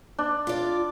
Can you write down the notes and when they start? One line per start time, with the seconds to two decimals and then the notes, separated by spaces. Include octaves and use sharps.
0.18 D4
0.47 F4 D5